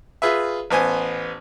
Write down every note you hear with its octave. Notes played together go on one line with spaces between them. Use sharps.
F4 G#4 B4 E5
A1 B3 C5 G#5